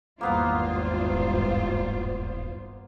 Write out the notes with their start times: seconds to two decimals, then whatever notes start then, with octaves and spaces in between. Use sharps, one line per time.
0.21 G#1 E2 G2 A#3 B3 F4 C5 F5
1.12 D#1